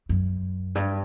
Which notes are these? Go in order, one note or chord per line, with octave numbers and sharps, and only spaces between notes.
F#2
G2